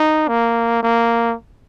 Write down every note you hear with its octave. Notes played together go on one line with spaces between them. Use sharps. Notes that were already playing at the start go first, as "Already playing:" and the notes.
Already playing: D#4
A#3
A#3